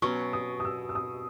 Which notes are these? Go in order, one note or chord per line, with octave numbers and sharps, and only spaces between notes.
B2 F#3 C#4 C#6
D#6
D#6
E6
E6
D#6